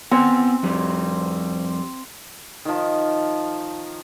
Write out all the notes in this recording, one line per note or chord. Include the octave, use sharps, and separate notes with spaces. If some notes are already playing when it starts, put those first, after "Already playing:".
B3 C4 F#5 G#5
F2 G3
D#3 F3